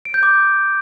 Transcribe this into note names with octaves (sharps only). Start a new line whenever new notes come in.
D7
G6
D6